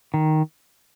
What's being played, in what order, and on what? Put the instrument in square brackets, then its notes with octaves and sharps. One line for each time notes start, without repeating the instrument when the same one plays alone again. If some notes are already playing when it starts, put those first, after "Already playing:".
[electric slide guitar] D#3